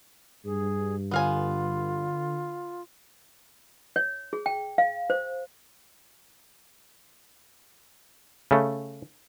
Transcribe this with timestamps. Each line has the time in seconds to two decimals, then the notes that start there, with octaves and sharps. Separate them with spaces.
0.45 G2 G#4
1.11 D3 B3 F4 F5 G#5
3.96 C#5
4.33 G#4
4.46 G5
4.78 F5
5.10 C5
8.51 C#3 A3